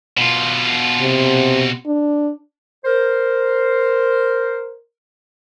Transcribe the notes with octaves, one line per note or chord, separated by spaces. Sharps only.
B2 F4
C3
D4
A#4 C5